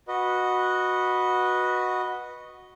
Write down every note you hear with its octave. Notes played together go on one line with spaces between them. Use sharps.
F#4 B4 D#5